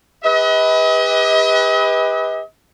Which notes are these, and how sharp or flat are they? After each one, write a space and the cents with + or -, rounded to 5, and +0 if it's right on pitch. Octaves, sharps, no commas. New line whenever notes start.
G4 +45 B4 +0 D#5 +40